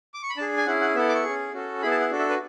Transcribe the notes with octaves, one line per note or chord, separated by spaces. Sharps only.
D6
C#6
B5
D4 G#4 A5
G#5
C#4 E4 G#4 F#5
F#5
B3 E4 A4 E5
D6
C#6
C#4 G#4
C#4 F#4 A4
B3 E4 G#4 B5
A5
F#5
D4 F#4 A4
E5
B4